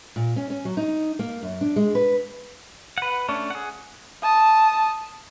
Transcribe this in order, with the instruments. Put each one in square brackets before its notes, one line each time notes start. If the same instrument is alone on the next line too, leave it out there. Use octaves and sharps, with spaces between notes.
[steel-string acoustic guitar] A#2
C#4
C#4
F#3
D#4
A#3
F#2
D4
G#3
B4
[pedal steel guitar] B4 F#5
A3 C#4 D4
G#4 F#5
[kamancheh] A5 D#6